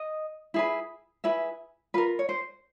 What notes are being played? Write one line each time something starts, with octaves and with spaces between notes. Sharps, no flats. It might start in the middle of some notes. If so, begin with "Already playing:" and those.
Already playing: D#5
E4 G#4 B4
E4 G#4 B4 E5
F4 A#4 B4
C#5
C5